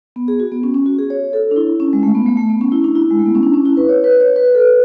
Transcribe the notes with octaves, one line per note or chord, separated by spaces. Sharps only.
B3
G#4
F#4
B3
C#4
C#4
F#4
G#4
C#5
A4
D4
E4
C#4
G#3
A3
B3
A3
A3
B3
C#4
E4
D4
E4
G#3
A3
B3
C#4
D4
C#4
E4
B4
C#5
B4
C#5
B4
A4
B4